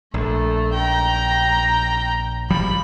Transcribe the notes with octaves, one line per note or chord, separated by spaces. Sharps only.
A#1 A3
G5 A#5
G#1 F3 G3 B5